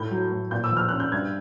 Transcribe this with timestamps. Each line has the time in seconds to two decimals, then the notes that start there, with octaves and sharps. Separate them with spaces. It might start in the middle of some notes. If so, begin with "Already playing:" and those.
Already playing: A2 G6
0.11 F#3
0.32 A2
0.51 A#2 G6
0.64 E6
0.72 F3
0.77 F6
0.89 C#4 F#6
1.00 G6
1.12 G2 G#6